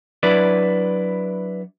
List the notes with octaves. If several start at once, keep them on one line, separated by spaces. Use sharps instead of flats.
F#3 D4 E4 B4 D5